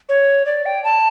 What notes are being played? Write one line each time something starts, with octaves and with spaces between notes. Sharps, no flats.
C#5
D5
G5
A5